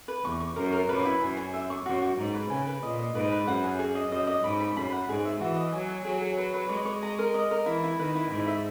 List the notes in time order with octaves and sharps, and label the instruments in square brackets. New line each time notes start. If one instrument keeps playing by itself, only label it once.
[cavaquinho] B4
[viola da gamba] E2 [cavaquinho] C#6
[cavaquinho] C#6
[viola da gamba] F#2 [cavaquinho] A#4
[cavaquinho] A#4
[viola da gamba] F#2 [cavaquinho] B4
[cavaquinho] E4
[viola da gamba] F#2 [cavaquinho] G#5
[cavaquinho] G#5
E5
C#6
[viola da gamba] F#2 [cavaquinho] F#4
[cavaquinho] F#4
[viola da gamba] G#2 [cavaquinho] A#5
[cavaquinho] B4
[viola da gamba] C#3 [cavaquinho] G#5
[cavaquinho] B4
[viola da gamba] A#2 [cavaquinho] D#5
[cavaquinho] D#5
[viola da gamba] G#2 [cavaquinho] B4
[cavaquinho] B4
[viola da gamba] F#2 [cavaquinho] F#5
[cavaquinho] G#4
G#4
D#5
[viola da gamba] F#2 [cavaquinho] D#5
[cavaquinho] D#5
[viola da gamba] G#2 [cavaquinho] B5
[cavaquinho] B5
[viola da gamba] F#2 [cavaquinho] B5
[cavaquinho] F#5
[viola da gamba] G#2 [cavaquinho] G#4
[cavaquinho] E5
[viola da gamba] E3 [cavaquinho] F#4
[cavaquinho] D#5
[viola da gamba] F#3 [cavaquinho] G#5
[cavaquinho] G#5
[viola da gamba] F#3 [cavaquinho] G#4
[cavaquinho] G#4
B4
B4
[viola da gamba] G#3 [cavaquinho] C#5
[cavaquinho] C#5
A#5
A#4
D#5
A#4
[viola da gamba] E3 [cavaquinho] E4
[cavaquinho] E4
[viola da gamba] D#3 [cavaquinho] B4
[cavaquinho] E4
[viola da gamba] G#2 [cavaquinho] E4
[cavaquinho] E5